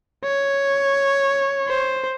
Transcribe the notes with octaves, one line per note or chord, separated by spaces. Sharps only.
C#5
C5